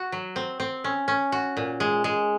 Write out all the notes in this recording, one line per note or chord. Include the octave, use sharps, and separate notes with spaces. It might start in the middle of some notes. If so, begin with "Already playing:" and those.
Already playing: F#4
F#3
C4
C4
C#4
C#4
F#4
A#2
G#3
G#3